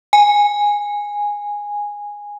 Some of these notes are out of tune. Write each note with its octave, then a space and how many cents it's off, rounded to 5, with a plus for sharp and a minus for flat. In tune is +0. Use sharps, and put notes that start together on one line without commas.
G#5 -10